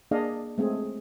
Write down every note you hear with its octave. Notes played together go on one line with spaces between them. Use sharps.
A#3 D4 G#4 D5 D#5 F5
G#3 A3 C4 G#4